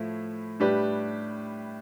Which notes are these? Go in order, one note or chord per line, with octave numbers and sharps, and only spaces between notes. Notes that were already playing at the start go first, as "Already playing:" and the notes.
Already playing: A2 F3 A3 E4
A2 G3 D4 G4 B4